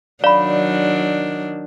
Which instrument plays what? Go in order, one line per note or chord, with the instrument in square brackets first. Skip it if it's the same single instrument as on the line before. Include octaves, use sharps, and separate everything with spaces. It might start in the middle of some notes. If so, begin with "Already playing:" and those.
[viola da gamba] D#3 F#3 D4 [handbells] D5 [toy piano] F5 B5